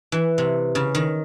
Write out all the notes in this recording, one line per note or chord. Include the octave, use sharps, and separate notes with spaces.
E3
C3
C#3
D#3